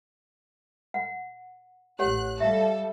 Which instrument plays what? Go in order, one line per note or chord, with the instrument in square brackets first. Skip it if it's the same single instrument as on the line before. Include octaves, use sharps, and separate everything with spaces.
[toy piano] F#5
[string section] A1 F#6 [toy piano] G4 C#5 F#5
[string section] G3 A4 [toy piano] E5 F5